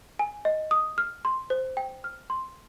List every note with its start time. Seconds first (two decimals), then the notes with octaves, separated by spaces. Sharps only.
0.19 G#5
0.45 D#5
0.71 D#6
0.98 F6
1.25 C6
1.50 C5
1.77 G5
2.04 F6
2.30 C6